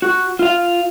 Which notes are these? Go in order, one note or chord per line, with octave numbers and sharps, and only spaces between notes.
F#4
F4 F5